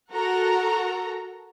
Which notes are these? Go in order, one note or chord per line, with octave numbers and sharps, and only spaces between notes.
F#4 A4 A#4 F#5 A#5